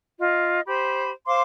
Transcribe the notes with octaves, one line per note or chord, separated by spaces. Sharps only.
F4 D#5
G4 C5 B5
C5 F5 C6 D6